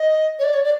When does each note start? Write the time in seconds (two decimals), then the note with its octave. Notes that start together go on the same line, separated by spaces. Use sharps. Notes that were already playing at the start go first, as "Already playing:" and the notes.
Already playing: D#5
0.39 C#5
0.44 D5
0.54 C#5
0.64 D5